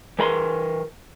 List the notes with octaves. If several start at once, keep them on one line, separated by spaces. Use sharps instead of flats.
E3 A#4 B5 C6